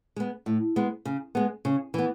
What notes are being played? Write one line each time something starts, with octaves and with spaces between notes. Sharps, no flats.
G#3 B3
A2
G#3 B3
C#3
G#3 B3
C#3
E3 B3